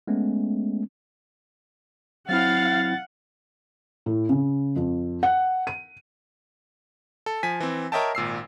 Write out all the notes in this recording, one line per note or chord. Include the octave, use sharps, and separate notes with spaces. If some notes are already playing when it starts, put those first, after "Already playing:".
G#3 A3 B3 C#4
F#3 C4 E4 F5 F#5 A6
A2
C#3
F2
F#5
D#7
A4
F3 G#5 B6
E3 C4
A#4 C#5 D#5 E5 G5 A5
G#1 A#2 E6 C7